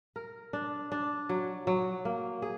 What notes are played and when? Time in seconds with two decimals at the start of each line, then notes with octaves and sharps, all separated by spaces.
0.16 A#4
0.53 D4
0.92 D4
1.29 F#3
1.67 F#3
2.05 A#3
2.42 G#4